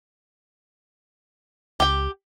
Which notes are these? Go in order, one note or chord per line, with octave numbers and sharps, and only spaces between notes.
C#2 G4 G5